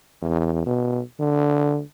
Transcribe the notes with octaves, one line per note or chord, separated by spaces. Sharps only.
E2
B2
D3